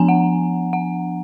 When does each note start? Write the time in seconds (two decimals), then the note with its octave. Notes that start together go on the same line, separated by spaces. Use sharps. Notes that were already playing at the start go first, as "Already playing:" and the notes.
Already playing: F3 B3 D4 G#5 A#5
0.09 F#5
0.73 F#5